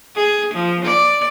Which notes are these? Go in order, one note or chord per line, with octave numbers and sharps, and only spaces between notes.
G#4
F3
D5